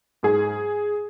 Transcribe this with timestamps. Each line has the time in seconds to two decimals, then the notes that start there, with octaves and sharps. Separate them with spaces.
0.23 G#2 G#4